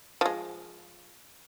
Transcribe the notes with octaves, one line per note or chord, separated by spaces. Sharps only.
F3 G#3